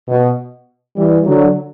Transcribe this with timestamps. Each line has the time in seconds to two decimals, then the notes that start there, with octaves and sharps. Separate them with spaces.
0.09 B2
0.97 E3 G3
1.26 D3 F#3